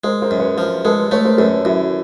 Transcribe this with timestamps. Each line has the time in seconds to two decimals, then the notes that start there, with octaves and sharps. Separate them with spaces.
0.04 G#3 A#4 C5
0.22 A#4 C5
0.31 F#2
0.40 B4 C#5
0.57 F3 A#4 C5
0.85 G#3 A4 B4
1.11 A3 B4 C#5
1.25 A#4 C5
1.38 F#2 A4 B4
1.65 F#2 E4 F#4